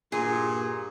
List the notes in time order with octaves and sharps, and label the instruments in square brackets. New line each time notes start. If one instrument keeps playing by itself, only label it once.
[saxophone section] G2 A#2 [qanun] G#4